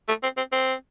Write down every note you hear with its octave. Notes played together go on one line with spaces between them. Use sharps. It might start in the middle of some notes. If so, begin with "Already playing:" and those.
A3
C4
C4
C4